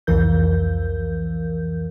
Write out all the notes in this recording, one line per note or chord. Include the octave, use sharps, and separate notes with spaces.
C2 F2 E3 A#4 G6